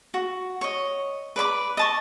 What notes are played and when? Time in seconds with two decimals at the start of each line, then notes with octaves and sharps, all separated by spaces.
0.14 F#4
0.61 C#5 D#5
1.36 B4 D5 B5 D6
1.77 D#5 A5 C#6